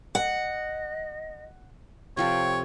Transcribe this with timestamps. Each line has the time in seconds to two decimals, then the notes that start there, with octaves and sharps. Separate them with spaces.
0.15 D#5 F#5
2.17 C3 F3 A4 C#5 G5